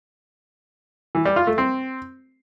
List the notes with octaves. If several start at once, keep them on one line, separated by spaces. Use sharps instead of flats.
E3
G3
F4
A3
C4